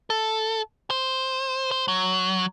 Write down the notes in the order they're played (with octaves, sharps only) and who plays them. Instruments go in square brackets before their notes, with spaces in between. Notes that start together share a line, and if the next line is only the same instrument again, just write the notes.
[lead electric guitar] A4
C5
C5
F#3